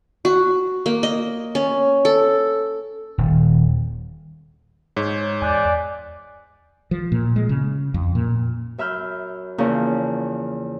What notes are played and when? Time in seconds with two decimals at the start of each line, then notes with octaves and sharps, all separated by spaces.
0.25 F#4
0.86 A#3
1.03 D#5
1.55 C#4
2.05 A4
3.18 D#1
4.97 G#2 C#5
5.42 E2 D5 G#5 F#6 G6
6.91 F3
7.12 A#2
7.36 G#3
7.49 C#3
7.94 F2
8.15 A#2
8.78 F#2 E5 B5 F6 G6
9.58 E2 C#3 F3 A#3 C#4